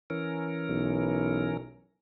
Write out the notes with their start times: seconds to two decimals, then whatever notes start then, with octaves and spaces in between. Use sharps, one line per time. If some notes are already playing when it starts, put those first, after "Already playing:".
0.10 E3 C#4 A#4
0.69 B1